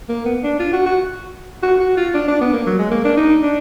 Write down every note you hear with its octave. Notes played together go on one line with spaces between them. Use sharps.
A#3
B3
D4
F4
F#4
F#4
F#4
F#4
F4
D4
D4
B3
A#3
F#3
G#3
A#3
D4
D#4
D4